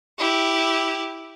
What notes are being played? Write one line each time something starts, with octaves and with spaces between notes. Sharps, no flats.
E4 G4